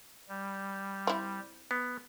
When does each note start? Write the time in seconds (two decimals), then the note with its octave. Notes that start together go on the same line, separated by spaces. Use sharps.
0.29 G3
1.07 C4 E4
1.71 B3